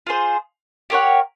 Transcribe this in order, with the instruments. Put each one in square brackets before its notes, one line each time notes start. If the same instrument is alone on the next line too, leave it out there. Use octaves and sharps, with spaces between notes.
[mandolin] F4 G#4 C5
G4 A#4 C#5 F#5